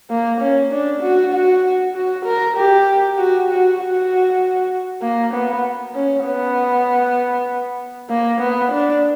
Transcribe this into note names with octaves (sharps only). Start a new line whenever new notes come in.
A#3
C#4
D4
F#4
F#4
F#4
A#4
G4
F#4
F#4
F#4
A#3
B3
C#4
B3
A#3
B3
D4